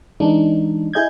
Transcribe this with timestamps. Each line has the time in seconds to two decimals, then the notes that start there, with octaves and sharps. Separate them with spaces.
0.20 E3 G#3 D4 D#4
0.93 E4 G#4 D#5 G6 G#6